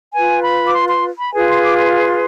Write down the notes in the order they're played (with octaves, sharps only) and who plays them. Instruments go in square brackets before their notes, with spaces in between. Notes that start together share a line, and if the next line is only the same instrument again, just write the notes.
[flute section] F4 B4 G#5
B5
D6
C6
C6
B5
F4 G#4 B4 G#5
C6
D6
C6